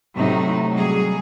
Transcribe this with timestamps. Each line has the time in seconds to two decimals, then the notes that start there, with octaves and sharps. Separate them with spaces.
0.14 A2 C3 F#3 A3 D#4
0.73 F#3 G3 G#4